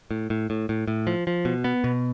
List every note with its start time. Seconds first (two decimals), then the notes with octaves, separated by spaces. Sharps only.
0.11 A2
0.30 A2
0.50 A2
0.69 A2
0.88 A2
1.07 F3
1.27 F3
1.45 B2
1.64 B3
1.84 B2